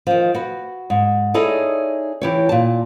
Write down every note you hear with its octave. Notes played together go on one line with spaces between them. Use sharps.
D#3 F3
F#4 B4
G#2
D#4 E4 G#4 A4 C#5 D5
E3 G4 C#5
A#2 A5